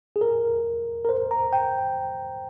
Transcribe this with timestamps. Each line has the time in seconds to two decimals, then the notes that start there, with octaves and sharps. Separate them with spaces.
0.16 G#4
0.21 A#4
1.05 A#4
1.09 C5
1.31 A#5
1.53 G5